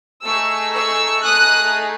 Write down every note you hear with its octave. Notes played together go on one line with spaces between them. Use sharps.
A3 D#4 G#4 C#6 E6
C#6 E6
A3 D#4 G#4 D#6 F#6